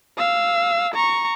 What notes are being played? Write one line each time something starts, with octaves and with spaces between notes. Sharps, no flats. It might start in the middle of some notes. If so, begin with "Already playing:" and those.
F5 E6
A#5 C#6